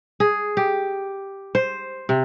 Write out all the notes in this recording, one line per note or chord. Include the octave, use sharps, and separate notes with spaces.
G#4
G4
C5
C3